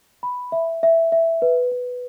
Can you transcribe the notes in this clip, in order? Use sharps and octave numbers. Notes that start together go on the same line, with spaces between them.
B5
E5
E5
E5
B4
B4